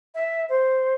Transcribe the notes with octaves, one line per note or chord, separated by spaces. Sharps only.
E5
C5